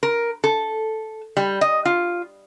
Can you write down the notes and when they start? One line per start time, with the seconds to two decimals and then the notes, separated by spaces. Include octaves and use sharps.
0.03 A#4
0.44 A4
1.37 G3
1.61 D#5
1.85 F4